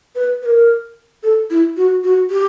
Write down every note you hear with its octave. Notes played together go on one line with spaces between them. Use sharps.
B4
B4
A#4
A4
E4
F#4
F#4
G4